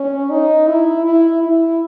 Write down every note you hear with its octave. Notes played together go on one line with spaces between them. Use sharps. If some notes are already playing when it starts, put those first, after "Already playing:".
Already playing: C#4
D#4
E4
E4
E4